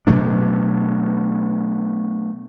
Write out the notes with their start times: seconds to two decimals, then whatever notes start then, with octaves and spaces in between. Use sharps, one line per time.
0.07 B2 F#3 A3 D4